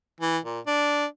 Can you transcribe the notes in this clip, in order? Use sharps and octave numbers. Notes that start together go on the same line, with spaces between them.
E3
A#2
D4